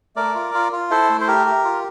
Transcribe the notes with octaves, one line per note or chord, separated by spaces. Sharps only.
A3 A#4 D5
F4
F4
F4
E4 A4 C5
A3
C5
G4 A#4
G4
F4